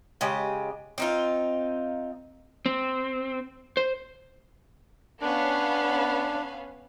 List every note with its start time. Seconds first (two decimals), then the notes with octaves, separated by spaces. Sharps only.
0.21 C#3 G#3 G4 D#5
0.98 C4 D#4 F4
2.66 C4
3.77 C5
5.21 B3 C#4 D4 F5